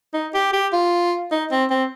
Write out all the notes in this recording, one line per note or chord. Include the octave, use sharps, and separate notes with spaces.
D#4
G4
G4
F4
D#4
C4
C4